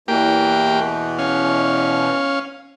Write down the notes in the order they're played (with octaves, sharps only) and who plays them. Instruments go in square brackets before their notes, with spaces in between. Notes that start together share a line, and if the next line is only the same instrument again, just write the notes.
[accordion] E2 B2 E3 [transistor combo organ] A#3 G4 G5
[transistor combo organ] C#4 F5